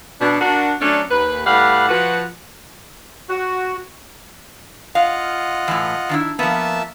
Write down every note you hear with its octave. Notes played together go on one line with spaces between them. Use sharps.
B2 D4
D4 F#4 A#4
F#3 A3 C#4 D4
D#2 B4
A2 G3 B4 D5 F5 F#5
F3 F#4 B4
F#4
F4 D#5 F5 F#5
A2 E3
D#3 D4 E4
F3 A#3 B3 E5 A5